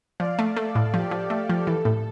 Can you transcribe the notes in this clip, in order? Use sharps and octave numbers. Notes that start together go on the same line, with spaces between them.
F3 D5 F5
A3
A3 A4
A2
F3 G4
F3
A3
F3
E3 A4
A2